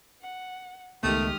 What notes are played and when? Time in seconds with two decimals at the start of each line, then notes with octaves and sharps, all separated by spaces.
0.21 F#5
1.03 C#2 D#3 G#3 A3 B3 G4 D#6 F6